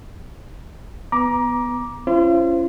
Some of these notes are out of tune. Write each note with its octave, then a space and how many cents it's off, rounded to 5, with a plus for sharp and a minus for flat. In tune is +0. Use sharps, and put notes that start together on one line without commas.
B3 +0 A#5 +25 D6 +0
C#4 +0 F4 -40 C5 +0